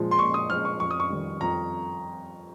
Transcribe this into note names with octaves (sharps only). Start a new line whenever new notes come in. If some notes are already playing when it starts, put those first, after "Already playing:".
Already playing: A#2 F3 G#3
C6
A#2 C#6
D#6
F3 G#3 F6
C#6
F2 C#6
D#6
C#6
D#3 G3
F2 A#5